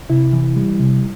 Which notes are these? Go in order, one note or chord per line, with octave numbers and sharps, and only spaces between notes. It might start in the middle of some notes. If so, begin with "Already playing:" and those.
C3 E4
E3
G3
C3